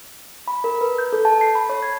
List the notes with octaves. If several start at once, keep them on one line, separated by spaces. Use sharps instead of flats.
B5
A#4
B4
G6
A4
A5
C7
B5
C#5
G#6